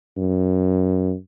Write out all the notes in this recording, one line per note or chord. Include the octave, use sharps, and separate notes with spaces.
F#2